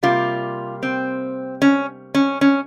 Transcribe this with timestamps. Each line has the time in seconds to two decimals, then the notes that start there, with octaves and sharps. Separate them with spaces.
0.03 C3 G3 A#3 F4
0.83 C4
1.62 C#4
2.14 C#4
2.41 C#4